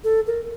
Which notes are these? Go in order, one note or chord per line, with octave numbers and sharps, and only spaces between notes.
A4
A#4